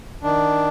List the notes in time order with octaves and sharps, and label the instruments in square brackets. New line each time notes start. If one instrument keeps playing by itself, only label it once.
[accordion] D#3 D4